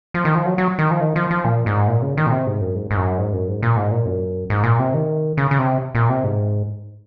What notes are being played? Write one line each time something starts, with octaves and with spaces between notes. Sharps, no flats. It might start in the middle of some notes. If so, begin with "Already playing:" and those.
F3
D#3
F3
F#3
F#3
D#3
F3
D#3
F3
F3
A#2
G#2
A#2
C#3
D#3
A#2
C3
G#2
F#2
G#2
G#2
F#2
G#2
F#2
G#2
A#2
G#2
A#2
F#2
G#2
A#2
C3
D#3
C#3
C#3
C3
A#2
C3
G#2